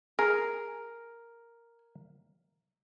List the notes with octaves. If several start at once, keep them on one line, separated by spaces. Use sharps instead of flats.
G#4 A#4